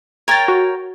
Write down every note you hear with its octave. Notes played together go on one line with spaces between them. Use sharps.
A#4 C#5 G5 G#6 A6
F#4